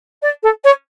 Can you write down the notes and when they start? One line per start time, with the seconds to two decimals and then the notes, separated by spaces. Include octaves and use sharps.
0.22 D5
0.43 A4
0.64 C#5